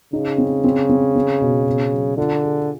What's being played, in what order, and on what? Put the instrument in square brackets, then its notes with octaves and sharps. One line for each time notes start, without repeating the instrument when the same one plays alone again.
[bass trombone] C#3 [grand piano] D#4
[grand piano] C4
C4
C4
C4
B2
B2
F#3
[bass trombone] D3 [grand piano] F4
[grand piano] G#4